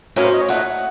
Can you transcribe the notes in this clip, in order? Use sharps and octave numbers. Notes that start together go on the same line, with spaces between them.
A2 F#3 A#3 C#4 A#4
C5
D#5
C#5
A#2 A3 D#4 F#5